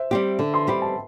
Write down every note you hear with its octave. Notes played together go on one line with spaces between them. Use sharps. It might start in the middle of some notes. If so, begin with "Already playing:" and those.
Already playing: C5 E5
G3 C4 G4
D3
C6
G3 C4 G4 B5
A5